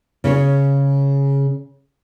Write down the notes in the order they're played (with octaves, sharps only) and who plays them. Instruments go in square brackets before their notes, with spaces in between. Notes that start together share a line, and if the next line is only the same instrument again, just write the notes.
[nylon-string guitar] C#3 C#4 C#5